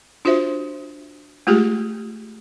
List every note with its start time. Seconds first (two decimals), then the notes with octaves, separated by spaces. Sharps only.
0.25 D4 F4 F#4 C5 E5
1.47 G#3 A3 F4 G4 G#4